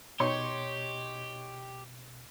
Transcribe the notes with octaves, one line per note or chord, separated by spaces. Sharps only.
B2 D#4 G4 C#5 C6 C#6